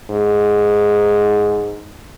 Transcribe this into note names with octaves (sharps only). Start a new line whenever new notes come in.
G#2